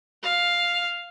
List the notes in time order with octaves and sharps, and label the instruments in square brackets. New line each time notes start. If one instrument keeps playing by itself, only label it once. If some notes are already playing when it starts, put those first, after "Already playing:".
[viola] F5